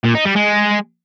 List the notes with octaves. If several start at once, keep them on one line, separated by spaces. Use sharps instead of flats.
A#2
D#4
G3
G#3